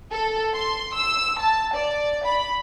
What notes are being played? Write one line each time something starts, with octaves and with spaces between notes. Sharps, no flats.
A4
C6
E6
A5
D5
B5